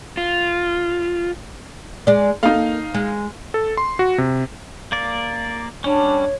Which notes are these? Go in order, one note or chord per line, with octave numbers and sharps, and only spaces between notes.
F4
G#3 D5
A#3 D#4 A4 F5
G#3
A4
C6
F#4
C3
A#3 D5
G3 C#4 D4 C#5